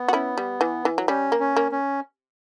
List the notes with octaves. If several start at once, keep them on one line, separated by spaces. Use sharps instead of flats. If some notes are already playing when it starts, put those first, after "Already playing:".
Already playing: B3
F#4
C#4 E4
G3
E3
E3
F#3
G3 C#4
A#3
C#4
A#3
C#4